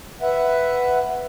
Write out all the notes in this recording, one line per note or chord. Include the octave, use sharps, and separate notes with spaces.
B4 E5 F#5